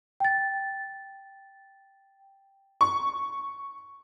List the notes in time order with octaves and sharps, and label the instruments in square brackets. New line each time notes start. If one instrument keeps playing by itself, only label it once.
[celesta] G5 A6
[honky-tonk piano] C#6